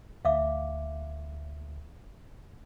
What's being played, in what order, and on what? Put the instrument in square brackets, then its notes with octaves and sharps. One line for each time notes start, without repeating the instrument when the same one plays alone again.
[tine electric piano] D2 [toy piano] E5 F5 D6